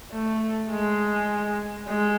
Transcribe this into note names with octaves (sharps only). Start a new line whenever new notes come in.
A3
G#3
G#3